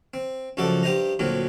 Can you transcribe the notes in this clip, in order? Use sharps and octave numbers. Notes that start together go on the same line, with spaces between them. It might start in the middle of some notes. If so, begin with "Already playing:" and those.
C4
C#2 F#2 F3 F#4 A4 D5
G2 G4 C5 D#5 A#5
D2 A#2 F#3 C4